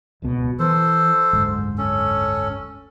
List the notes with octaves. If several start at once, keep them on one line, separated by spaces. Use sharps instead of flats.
D1 C#2 B2
E3 A4 C5
F#1 D2 G#2
C#4 A4